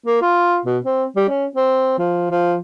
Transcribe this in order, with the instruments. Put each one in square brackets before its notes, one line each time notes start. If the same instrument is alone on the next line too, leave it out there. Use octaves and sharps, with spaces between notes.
[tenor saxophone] A#3
F4
B2
C4
G3
C#4
C4
F3
F3